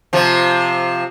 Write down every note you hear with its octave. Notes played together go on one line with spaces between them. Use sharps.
C3 F3